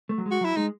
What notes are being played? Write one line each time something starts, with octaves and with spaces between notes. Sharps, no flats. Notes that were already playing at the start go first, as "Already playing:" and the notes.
A3
F#3
G#3
F#4
F#3 E4
G#3 D#4